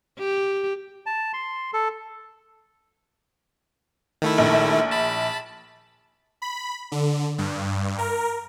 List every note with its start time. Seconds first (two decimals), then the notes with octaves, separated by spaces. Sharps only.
0.19 G4
1.06 A5
1.33 C6
1.74 A4
4.22 D#3 A3 E4
4.38 A#1
4.91 A5 B5
6.42 B5
6.92 D3
7.38 G2
7.98 A#4